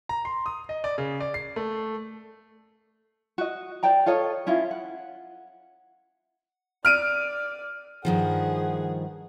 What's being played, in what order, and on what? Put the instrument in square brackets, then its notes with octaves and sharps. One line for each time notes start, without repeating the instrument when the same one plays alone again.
[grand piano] A#5
C6
D#6
D#5
D5
C#3
D5
C7
A3
[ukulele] F#4 D#5
C5 D5 G5 A#5
F4 A4 C#5 D#5
C#4 E4 F4
F#5
[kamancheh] D5 [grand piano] F6 D7 D#7
[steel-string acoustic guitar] G2 D#3 F3 [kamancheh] G#4 F#5